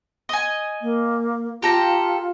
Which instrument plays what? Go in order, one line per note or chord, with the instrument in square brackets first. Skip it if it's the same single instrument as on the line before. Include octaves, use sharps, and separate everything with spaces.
[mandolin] D#5 G#5
[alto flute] A#3
[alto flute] F4 [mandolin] G4 A4 A#5